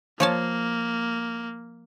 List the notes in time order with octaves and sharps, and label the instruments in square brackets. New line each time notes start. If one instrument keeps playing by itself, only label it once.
[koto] F3 C#5 A5 [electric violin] A#3